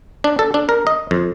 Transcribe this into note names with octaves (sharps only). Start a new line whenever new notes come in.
D4
A4
D4
A#4
D#5
F2